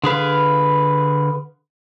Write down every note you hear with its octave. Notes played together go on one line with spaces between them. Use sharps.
D3 G#4 B4 F5